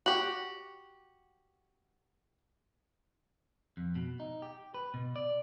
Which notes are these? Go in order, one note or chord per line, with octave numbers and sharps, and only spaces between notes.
F#4 G4 F#7
F2
B2
D#4
G4
B4
B2
D5